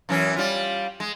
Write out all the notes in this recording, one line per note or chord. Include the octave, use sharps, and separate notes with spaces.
F#2 E3 C#4
G3 F4
G#3